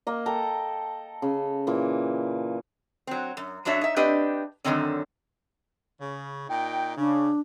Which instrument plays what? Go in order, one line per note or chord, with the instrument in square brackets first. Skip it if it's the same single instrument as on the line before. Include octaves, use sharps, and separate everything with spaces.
[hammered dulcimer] A#3 D#5
A4 G5 A#5
C#3
A#2 E3
[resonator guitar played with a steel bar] F#3 C4
F#2
F#2 D4 F#4 C#5 E5
D#4 E5
C4 D4 G4 B4 D#5
F#2 A#2 D3 D#3 C4 C#4
[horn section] C#3
A#2 D#4 G5
[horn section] C#3 [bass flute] D4